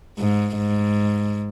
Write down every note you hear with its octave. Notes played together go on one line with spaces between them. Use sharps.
G#2
G#2